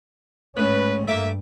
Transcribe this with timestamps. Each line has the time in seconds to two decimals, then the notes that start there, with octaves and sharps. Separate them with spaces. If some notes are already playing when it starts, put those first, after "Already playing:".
0.57 A1 G#2 C#4 B4
1.08 G2 A3 A#3 E5 D6